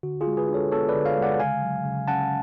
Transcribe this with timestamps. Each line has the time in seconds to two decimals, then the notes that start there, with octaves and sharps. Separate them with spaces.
0.03 D3 F#4
0.21 F4 G#4
0.27 G#3
0.37 G#4 B4
0.49 D4
0.54 A4 C#5
0.71 B3 A4 C#5
0.89 B4 D5
0.95 D3
1.06 C#5 F5
1.17 G#3
1.22 D5 F#5
1.40 C#3 F5 G#5
1.63 F#3
1.85 C#3
2.08 C#4 F#5 A5